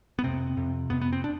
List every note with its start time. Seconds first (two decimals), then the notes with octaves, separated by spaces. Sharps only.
0.19 B3
0.24 F2 C3 C4
0.57 F2 C3
0.90 F2 C3 B3
1.01 B3
1.12 C4
1.24 D4